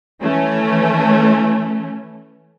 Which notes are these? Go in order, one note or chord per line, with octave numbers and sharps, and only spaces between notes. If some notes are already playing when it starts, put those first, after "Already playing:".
E3 A3 C#4